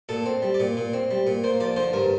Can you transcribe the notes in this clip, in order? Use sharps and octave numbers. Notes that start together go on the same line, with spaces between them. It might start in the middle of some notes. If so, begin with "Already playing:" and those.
A#2 A4
C4
G3
D5
A#2
A#2
C4
G3
A#2
A#3 C5
F3 D5
D3 C5
G2 A#4